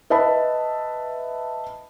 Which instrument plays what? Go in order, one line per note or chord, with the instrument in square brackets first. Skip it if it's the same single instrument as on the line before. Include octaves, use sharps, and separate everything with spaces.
[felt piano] B4 D#5 E5 A5 B5